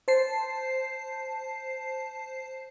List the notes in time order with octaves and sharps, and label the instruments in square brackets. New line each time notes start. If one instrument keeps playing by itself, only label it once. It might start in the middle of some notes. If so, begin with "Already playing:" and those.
[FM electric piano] C5 A5 C7